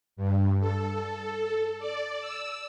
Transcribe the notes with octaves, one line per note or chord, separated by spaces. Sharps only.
G2
A4
D5
E6